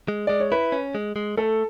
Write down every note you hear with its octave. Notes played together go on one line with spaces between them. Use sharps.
G#3
G#3 D5
C#5
E4 B4
C#4
G#3
G#3
A3 A4